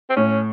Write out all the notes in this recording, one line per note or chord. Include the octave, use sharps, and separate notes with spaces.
C4
A2 C#4